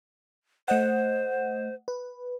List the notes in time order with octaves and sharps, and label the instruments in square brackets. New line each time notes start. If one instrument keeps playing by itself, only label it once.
[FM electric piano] A3 D#5 F#5 [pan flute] C5
[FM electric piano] B4